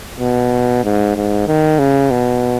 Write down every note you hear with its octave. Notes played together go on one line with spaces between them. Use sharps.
B2
G#2
G#2
D#3
C#3
B2